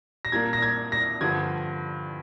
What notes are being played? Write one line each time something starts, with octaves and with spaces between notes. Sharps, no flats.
A#6
A#2 G3 A#3 D4 G#6
A#6
G#6
A#6
G2 D3 F3 G#6